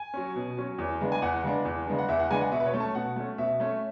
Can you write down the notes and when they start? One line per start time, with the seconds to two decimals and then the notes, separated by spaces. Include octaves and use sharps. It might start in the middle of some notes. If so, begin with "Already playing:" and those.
Already playing: G#5
0.14 F#3 C#4
0.36 B2
0.57 F#3 C#4
0.78 E2
1.01 C#3 G#3 B3 D4
1.12 G#5
1.22 E2 F#5
1.44 C#3 G#3 B3 D4
1.65 E2
1.87 C#3 G#3 B3 D4
1.98 F#5
2.09 E2 E5
2.19 F#5
2.30 C#3 G#3 B3 D4 G#5
2.41 F#5
2.52 B2 E5
2.60 B4
2.66 C#5
2.74 A3 C#4
2.80 A5
2.95 B2 F#5
3.16 A3 C#4
3.38 B2 E5
3.60 A3 C#4